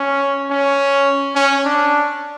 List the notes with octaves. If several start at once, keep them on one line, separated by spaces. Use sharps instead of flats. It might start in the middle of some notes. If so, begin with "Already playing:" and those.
Already playing: C#4
C#4
C#4
D4